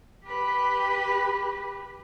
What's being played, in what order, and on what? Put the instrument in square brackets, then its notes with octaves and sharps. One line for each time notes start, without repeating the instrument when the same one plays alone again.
[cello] G4 B4